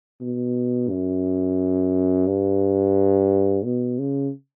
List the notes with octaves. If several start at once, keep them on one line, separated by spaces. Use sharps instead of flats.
B2
F#2
G2
B2
C#3